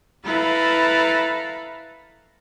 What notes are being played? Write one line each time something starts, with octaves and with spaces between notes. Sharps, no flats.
E4 A4 B4 F5 A#5